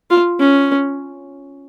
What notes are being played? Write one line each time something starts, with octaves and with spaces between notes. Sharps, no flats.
F4
C#4